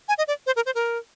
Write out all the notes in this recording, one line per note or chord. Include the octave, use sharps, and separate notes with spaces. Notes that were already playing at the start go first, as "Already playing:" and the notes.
G#5
D#5
D5
C5
A#4
C5
A#4